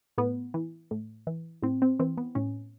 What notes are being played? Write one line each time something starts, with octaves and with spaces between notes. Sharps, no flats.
A2 B3
E3
A2
E3
A2 C4
C4
E3 C4
B3
A2 C#4